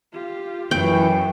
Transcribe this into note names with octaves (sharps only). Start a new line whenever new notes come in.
F4 G4
F#2 E3 G5